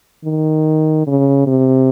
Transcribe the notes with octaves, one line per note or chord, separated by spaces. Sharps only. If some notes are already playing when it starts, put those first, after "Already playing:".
D#3
C#3
C3